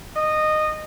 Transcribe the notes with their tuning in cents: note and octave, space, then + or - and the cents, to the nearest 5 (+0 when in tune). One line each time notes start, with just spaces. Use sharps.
D#5 -15